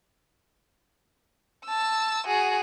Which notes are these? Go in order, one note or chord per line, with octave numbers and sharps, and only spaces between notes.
A5 E6
F#4 G#4